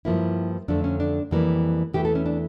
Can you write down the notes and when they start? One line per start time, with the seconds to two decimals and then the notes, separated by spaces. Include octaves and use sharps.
0.05 G2 F3 A#3 E4
0.68 F2 D3 A3 D4
0.84 C#4
1.00 D4
1.31 F2 E3 G3 A#3
1.93 E2 E3 A3 G4
2.05 A4
2.15 C#4
2.26 D4